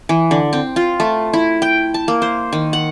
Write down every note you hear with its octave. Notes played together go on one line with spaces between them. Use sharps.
E3
D3
C4
F4
A3
E4
G5
A5
A#3
C5
D#3
F#5